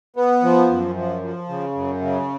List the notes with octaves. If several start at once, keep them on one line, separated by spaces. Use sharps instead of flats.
B3
F3
F#2
F3
F3
C#3
F#2
C#3